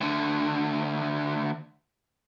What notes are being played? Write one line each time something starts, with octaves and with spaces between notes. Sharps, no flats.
D2 D3